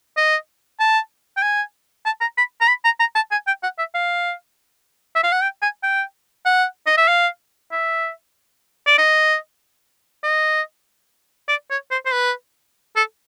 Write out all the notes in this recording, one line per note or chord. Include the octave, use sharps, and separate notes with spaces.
D#5
A5
G5
G#5
A5
A#5
B5
A#5
B5
A#5
A#5
A5
G#5
G5
F#5
E5
F5
E5
F5
F#5
G5
G#5
G5
F#5
D#5
E5
F5
E5
D5
D#5
D#5
D5
C#5
C5
C5
B4
A4